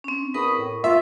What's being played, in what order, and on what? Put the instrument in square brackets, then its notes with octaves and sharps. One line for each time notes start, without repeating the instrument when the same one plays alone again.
[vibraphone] C4 C#4
D4
[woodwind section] E2 B5 D#6 [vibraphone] A#4 C#6
[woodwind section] A2
[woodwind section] F4 [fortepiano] E5